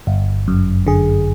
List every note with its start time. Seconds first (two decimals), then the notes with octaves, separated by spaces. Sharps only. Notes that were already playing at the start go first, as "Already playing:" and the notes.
0.07 G1
0.48 F#2
0.87 D3 G#4